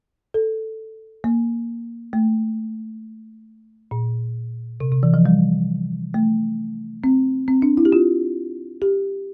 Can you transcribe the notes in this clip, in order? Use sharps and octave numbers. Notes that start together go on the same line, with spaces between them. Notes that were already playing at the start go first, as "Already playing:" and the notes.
A4
A#3
A3
A#2
C3
C3
E3
F3
G3
A3
C4
C4
D4
E4
G4
F4
G4